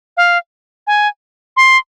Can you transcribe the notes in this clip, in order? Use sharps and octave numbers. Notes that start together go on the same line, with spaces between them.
F5
G#5
C6